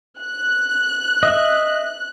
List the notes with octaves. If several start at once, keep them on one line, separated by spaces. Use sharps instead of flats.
F#6
D#5 E5